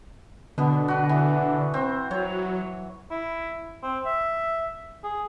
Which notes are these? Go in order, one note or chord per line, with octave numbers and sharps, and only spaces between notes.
B2 D3 B3
F#4 B4
E3
C4
F#3 C#5
E4
C4
E5
G#4